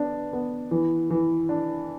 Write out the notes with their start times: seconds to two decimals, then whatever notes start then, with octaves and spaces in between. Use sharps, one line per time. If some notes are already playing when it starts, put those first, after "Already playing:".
Already playing: B3 D4
0.33 B3
0.71 E3
1.10 E3
1.49 D4